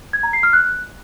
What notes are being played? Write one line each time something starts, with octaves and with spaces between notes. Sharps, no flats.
G#6
A#5
C7
F6
F#6